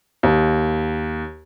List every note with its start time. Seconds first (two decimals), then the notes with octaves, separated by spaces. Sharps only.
0.23 D#2